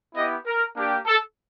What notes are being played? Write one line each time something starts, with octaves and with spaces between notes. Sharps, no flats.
B3 E4 G4 D#5
A#4
A#3 D4 G4
A4